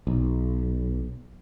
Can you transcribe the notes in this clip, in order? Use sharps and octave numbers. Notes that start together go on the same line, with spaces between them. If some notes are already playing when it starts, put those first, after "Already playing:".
B1